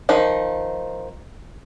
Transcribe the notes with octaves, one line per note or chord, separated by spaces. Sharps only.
D#3 F3 D#4